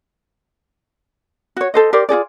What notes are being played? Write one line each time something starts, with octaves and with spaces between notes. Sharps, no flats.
F#4 C#5
A4 C5 D#5
G4 A#4 C5 D5
F4 F#4 G#4 D5